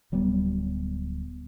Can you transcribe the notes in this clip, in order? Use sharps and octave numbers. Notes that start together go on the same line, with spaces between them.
D1 F#3 G3 B3